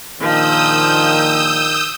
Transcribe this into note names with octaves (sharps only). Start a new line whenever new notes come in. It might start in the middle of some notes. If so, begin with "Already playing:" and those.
A#1 A#2 D#3 F3 D#6 E6 G6